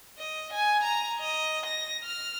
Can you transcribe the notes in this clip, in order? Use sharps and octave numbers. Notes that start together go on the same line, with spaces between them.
D#5
G#5
A#5
D#5
A#6
F6